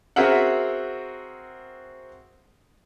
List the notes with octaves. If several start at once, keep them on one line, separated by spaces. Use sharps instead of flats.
C4 F#4 G#4 A#4 E5 F#5